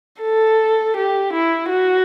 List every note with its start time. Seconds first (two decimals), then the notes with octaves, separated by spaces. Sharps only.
0.22 A4
0.96 G4
1.33 E4
1.69 F#4